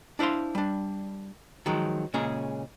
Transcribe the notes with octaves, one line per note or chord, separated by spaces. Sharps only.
D4 E4 C5 F5 C6
G3 D4
D#3 F3 F#3 G#3
A#2 C#3 G#3 C#4 G#4